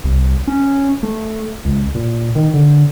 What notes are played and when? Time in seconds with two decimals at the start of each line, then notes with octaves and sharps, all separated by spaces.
0.04 C2
0.47 C#4
1.03 A3
1.65 C#2
1.95 A#2
2.35 D#3
2.54 D3